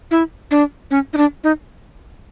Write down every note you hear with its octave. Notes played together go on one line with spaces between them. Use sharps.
E4
D4
C#4
D#4
D4
D#4